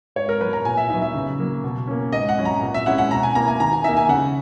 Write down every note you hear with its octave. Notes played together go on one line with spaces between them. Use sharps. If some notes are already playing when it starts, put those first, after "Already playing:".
G#2 C#5
A#4
F#3 B3 B4
A#5
A#2 G#5
E5
F#3 B3 D#4 E5
E5
C#3
F#3 A#3
B2
A#3 C#4
G#2 D#5
F#5
F#3 C#4 E4
A#5
A#2
E5
G#3 C#4 E4 F#5
F#5
B2 A#5
G#5
A#3 E4 A#5
G#5
D#3 A#5
G#5
A#3 D#4 E5
G#5
C#3 F#5